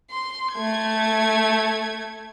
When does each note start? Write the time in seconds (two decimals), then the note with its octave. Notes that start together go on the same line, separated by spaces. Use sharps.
0.11 C6
0.54 A3 G#6